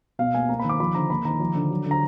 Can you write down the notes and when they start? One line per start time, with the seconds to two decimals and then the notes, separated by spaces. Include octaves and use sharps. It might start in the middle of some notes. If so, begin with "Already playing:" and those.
0.19 B2 F5
0.34 A#3 G#5
0.49 A#3 A#5
0.60 D#3 B5
0.70 D6
0.80 F3 B5
0.95 D3 A#5
1.10 A#3 B5
1.25 D#3 A#5
1.40 F3
1.55 D3
1.70 F#3
1.86 D3
1.91 A#5